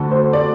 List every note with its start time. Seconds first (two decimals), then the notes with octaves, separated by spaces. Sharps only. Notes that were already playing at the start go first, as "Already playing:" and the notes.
Already playing: D2 D3 A4
0.11 C5
0.33 D5